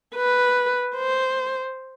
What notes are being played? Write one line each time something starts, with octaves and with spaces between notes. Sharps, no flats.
B4
C5